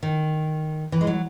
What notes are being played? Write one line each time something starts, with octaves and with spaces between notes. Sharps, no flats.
D#3
E3
G#3
F#3